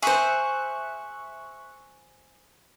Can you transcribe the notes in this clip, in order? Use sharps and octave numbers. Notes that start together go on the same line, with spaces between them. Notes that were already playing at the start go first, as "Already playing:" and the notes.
G#4 C5 E5 C#6 F#6